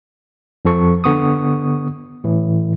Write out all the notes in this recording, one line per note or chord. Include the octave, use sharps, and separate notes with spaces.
F2 F3 A4 C#6
D3 B3 C#6 D#6
A2 E3